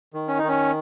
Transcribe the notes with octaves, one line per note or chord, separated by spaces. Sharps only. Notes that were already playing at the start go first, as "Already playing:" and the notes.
D#3
C#4
D#4
D#3 C#4